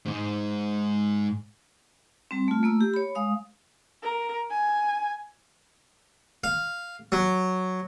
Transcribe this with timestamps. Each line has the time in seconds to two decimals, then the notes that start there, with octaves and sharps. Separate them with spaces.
0.05 G#2 G#3
2.31 G3 C4
2.48 A3 F4
2.63 A3 A#3 E6
2.81 G4
2.94 C#5 B5
3.15 G#3 F5 D#6
4.03 A#4
4.51 G#5
6.44 F5
7.12 F#3